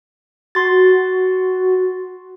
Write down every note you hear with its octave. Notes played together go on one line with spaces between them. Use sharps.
F#4 C6 A6